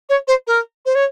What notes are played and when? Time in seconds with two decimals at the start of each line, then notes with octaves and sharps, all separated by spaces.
0.09 C#5
0.27 C5
0.47 A#4
0.85 C5
0.95 C#5